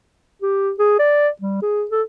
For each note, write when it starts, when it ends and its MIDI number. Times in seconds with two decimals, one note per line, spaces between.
0.42 0.71 67
0.79 0.95 68
0.99 1.29 74
1.42 1.61 55
1.62 1.85 68
1.91 2.02 69